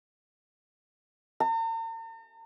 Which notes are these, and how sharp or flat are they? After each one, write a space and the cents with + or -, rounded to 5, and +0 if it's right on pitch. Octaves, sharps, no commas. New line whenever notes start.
A#5 -45